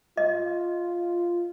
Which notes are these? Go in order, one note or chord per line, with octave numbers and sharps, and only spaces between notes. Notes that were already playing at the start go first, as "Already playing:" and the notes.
F4 D#5